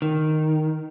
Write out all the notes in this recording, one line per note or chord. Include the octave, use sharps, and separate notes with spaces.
D#3